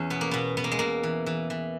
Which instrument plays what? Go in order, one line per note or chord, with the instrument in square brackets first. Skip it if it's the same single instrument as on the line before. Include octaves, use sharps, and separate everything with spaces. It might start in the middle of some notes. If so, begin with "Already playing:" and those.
Already playing: [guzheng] E2 C#4
B2 B3
A#3
B2 B3
B2 B3
A#3
G#3
B2 A#3
E3
E3
E3